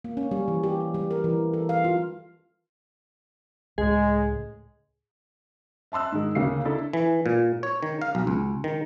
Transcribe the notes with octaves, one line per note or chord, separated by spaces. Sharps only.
A#3
C#4
G3
E3
G4
G4
G3
A#4
E3
A4
F5
F4
C#2 A2 G#3 G#4
E5 A5 C6 E6 F#6
G#2 D#3 G#3
D2 C#3 A#3 G4 F5 C7
D4 E4 A4
E3
A#2
C#5
D#3
F5
B1
C#2
D#3